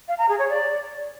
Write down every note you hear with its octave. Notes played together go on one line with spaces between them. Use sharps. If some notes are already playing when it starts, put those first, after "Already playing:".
F5
A#5
G#4
C#5
D5